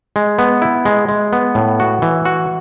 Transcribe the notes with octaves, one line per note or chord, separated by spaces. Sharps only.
G#3
B3
E4
G#3
G#3
B3
A2
F#4
E3
F#4